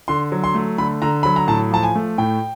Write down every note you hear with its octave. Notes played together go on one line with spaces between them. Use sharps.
D3 C6
F#3
C6
A3
D3 B5
D3 A#5
F#3 B5
A#5
A2 A5
F3 A5
G#5
A3
A2 G5